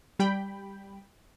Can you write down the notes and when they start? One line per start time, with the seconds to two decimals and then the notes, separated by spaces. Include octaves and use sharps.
0.19 G3 G5 B5